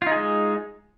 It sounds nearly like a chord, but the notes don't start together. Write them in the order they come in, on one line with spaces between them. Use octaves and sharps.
F4 D#4 G#4 G#3